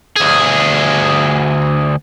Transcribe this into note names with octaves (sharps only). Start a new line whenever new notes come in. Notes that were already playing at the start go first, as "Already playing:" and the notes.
D2 G#4